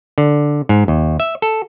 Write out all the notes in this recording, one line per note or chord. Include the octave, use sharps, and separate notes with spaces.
D3
G#2
D#2
E5
A4